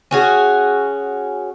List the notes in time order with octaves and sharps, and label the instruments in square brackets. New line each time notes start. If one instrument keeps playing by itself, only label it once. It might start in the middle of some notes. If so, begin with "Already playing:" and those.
[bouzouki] C#4 F#4 G#4